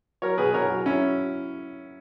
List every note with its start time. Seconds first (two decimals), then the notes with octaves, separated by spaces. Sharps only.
0.22 F#3 A#4 C#5
0.38 B2 G#4 B4
0.54 B2 A#4 C#5
0.70 F#3
0.86 F#3 C#4 E4